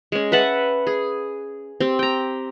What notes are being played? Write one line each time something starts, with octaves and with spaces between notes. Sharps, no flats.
G#3 C#4
B4 E5 F#5 A5
G#4
C4 G4
G5 A#5